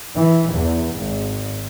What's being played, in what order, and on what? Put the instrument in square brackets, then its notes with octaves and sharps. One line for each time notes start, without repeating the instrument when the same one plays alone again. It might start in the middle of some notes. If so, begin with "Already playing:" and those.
[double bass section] E3
E2
G#1